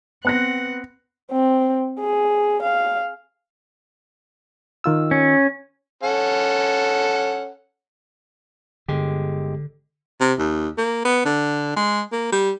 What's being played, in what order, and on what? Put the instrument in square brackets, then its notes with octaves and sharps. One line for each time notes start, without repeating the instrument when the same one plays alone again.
[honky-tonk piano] B3 F#6 A#6 [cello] C4 F#5
[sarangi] C4
G#4
F5
[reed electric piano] D#3 F4 E6
[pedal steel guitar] C#4
[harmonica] C#4 A4 F#5
[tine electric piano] G1 G#3 G4 [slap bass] D3
[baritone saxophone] C3
D#2
A#3
B3
D3
G#3
A#3
G3